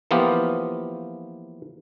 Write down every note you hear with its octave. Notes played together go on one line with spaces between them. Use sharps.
E3 F3 A#3 B3 F4 G4